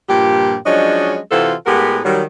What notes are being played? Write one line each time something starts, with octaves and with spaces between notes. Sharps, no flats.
G2 A#2 F3 G4
F3 F#3 G#3 C#4 D4 D#5
C3 E3 F4 F#4 A4 C5
A2 G#3 B3 F#4 G4 A#4
D#3 F#3 G3